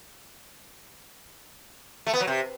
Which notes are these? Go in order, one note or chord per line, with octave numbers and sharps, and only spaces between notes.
A3
B3
F#3
C3